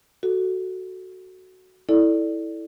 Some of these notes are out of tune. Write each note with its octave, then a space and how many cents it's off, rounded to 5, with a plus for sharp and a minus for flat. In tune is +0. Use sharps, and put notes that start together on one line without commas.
F#4 +5 A4 +0
E4 -10 A4 +0 D5 +0